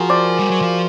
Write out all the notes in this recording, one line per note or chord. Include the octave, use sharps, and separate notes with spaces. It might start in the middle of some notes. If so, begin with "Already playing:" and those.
Already playing: F3 F#4 G#4 A#4
C5 D5
G3
F#3
F3